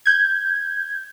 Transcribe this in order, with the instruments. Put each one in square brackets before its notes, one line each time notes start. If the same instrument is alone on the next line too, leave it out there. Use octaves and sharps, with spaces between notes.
[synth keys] G6 G#6